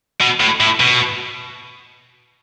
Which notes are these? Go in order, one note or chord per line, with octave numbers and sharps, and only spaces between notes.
B2
A2
A2
B2